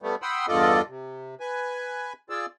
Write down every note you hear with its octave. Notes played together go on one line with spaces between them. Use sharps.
G3 A3 B3
F#5 G5 B5 C6 D#6 E6
E2 G2 F4 A4 D5 D#5
C3
B4 G#5
F4 G#4 D5 E6